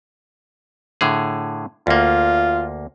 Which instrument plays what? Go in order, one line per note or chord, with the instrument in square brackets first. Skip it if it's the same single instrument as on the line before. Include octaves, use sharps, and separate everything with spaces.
[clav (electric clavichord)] A2 D3 G#4
[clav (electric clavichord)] D2 A#3 [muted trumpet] F4